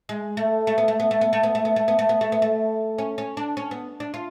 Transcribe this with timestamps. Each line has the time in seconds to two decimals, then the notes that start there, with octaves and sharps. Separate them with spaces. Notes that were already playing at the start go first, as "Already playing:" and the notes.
0.09 G#3
0.37 A3
0.67 A3
0.78 B3
0.88 A3
1.00 B3
1.11 A3
1.21 B3
1.33 A3
1.43 B3
1.55 A3
1.65 B3
1.76 A3
1.88 B3
1.99 A3
2.09 B3
2.21 A3
2.32 B3
2.42 A3
2.98 C#4
3.18 C#4
3.37 D4
3.57 C#4
3.71 B3
4.00 D4
4.14 F4